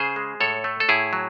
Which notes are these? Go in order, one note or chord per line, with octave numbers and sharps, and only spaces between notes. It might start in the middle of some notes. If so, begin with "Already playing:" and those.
Already playing: C#3 G#4 C5
G#3
A2 A4 C#5
A3
A4
A2 E4 G#4
F#3